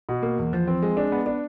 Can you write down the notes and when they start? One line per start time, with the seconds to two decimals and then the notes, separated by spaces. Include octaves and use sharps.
0.09 B2
0.22 A#3
0.38 E2
0.53 F3
0.68 C4
0.83 G#3
0.97 D4
1.12 B3
1.26 D4